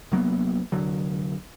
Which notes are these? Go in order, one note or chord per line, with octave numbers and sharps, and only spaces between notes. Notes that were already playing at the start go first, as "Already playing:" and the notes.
C2 F#3 A#3 B3
F1 D3 F#3